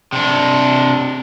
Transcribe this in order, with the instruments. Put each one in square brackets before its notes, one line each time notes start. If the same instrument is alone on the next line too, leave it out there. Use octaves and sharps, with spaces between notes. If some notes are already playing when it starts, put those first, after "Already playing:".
[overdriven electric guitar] C3 D4